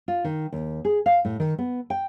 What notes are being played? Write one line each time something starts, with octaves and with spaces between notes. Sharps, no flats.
F4
D#3
D#2
G#4
F5
A2
D#3
B3
G5